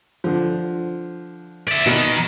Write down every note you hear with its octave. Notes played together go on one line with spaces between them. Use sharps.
D3 F3
D5 E5
B2 D#3